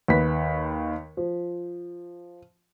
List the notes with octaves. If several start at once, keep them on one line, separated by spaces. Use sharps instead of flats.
D#2 B4 B6
F3